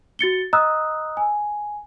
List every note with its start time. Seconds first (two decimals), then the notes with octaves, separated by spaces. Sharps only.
0.19 F#4 A6 C#7 G7
0.53 D#5 A#5 D#6 E6 F#6
1.17 G#5